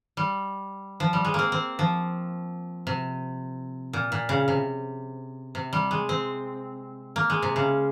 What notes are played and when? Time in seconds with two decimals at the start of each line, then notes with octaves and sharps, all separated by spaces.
0.17 G3
1.00 F3
1.13 G3
1.25 G#3
1.34 A#3 C4
1.52 C4
1.79 F3
2.87 C3
3.93 A#2
4.12 A#2
4.29 C#3
4.48 C3
5.55 C3
5.73 G3
5.91 G#3
6.09 C4
7.16 A#3
7.30 G#3
7.42 C3
7.56 C#3